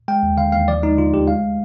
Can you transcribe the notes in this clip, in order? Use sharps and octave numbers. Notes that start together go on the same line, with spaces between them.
G#3 G5
D#2
D3 F5
D#2 F5
F3 D5
G#3 D#4
D3 F4
D2 G4
G#3 F5